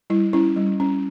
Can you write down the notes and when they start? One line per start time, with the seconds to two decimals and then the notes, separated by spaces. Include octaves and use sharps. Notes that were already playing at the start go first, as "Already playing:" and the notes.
0.10 G3 E4
0.33 C#4 E4
0.56 G3
0.80 C#4